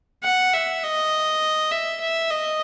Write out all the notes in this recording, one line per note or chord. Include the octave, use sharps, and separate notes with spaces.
F#5
E5
D#5
E5
E5
D#5